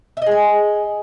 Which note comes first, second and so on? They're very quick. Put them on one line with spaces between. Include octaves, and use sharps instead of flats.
E5 D#5 G#4 G#5